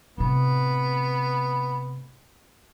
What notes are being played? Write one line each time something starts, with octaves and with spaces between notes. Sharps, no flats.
A2 C3 B3